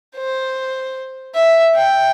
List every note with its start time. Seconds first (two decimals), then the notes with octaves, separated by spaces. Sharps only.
0.16 C5
1.35 E5
1.75 G5